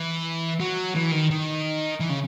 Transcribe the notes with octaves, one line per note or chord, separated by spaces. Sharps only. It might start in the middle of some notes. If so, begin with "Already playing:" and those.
Already playing: E3
F#3
E3
D#3
D#3
E3
C#3